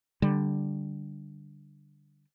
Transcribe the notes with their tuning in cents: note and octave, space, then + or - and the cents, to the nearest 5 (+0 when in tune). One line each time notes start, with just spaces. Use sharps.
D3 +0 G3 +0